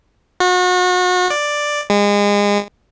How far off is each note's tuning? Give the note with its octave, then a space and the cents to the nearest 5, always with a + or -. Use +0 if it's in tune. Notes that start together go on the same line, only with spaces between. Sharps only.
F#4 -35
D5 +5
G#3 -30